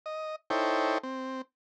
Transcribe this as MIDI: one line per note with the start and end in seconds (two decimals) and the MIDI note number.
0.06 0.36 75
0.50 0.98 63
0.50 0.98 64
0.50 0.98 69
0.50 0.98 72
0.50 0.98 73
0.50 0.98 79
1.03 1.42 60